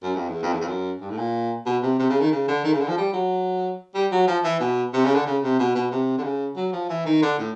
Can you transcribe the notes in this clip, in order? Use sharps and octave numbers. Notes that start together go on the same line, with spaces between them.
F#2
F2
E2
F2
E2
F2
F#2
G2
A2
A#2
B2
C3
C3
C#3
D#3
C#3
D3
D#3
C#3
D3
F3
G3
F#3
G3
F#3
F3
E3
B2
C3
C#3
D3
C#3
C3
B2
B2
C3
D3
C#3
F#3
F3
E3
D#3
D3
A2